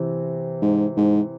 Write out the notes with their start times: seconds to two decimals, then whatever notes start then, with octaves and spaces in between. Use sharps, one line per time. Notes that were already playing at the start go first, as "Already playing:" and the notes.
Already playing: C3 E3 C4
0.62 G#2
0.97 G#2